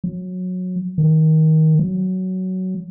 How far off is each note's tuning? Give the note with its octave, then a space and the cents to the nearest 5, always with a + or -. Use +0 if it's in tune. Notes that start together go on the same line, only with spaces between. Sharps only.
F#3 -20
D#3 +20
F#3 +10